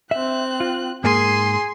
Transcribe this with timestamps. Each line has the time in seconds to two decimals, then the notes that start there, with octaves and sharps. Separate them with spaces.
0.11 C4 E5 F#6
0.60 F4
1.04 G#2 A#3 G#4 G#5 C6